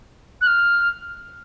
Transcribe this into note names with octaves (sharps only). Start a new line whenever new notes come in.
F#6
F6